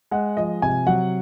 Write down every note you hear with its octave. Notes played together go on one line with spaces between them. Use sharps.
G#3 F#5
F3 D#5
C3 G#5
F#3 F#5